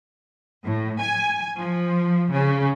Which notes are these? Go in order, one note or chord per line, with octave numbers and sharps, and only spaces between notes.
A2
G#5
F3
C#3